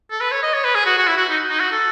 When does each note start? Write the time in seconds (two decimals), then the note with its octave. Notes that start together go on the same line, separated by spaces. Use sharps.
0.11 A4
0.21 B4
0.31 C#5
0.43 D#5
0.54 C#5
0.64 B4
0.75 G#4
0.86 F#4
0.98 F#4
1.07 E4
1.17 F#4
1.29 D#4
1.50 D#4
1.60 F#4
1.72 A4